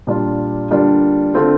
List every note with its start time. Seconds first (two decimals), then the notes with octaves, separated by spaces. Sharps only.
0.07 A#2 G3 D4 F4
0.71 D3 G3 A#3 D4 F4
1.34 D3 A3 C4 F4